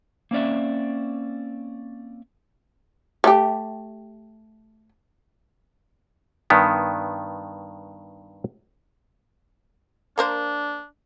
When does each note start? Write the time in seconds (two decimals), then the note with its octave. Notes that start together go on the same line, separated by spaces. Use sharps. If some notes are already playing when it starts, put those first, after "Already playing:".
0.31 A#3 C4 C#4 D5 E5
3.24 A3 G4
6.50 G2 D#3 B3
10.18 A#3 D4 A#4 C5